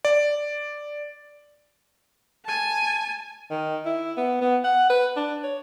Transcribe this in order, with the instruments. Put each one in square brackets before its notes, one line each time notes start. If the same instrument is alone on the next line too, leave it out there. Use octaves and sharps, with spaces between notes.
[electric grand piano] D5
[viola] G#5 A5
[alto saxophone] D#3
E4
B3
B3
F#5
B4
D4
C#5